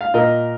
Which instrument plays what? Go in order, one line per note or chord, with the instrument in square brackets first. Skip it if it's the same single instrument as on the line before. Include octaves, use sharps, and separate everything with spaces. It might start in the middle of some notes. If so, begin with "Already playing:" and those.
[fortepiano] F5
A#2 A#4 D#5